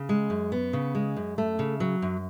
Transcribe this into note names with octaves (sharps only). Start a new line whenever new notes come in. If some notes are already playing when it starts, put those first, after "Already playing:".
Already playing: C#3
G#3
F#2
B3
C#3
G#3
F#2
A3
C#3
F#3
F#2